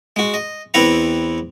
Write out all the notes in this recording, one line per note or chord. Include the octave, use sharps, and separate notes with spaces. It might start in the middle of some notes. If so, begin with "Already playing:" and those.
G#3 F#4
D#5
E2 C4 E4 B4 F#5 A#5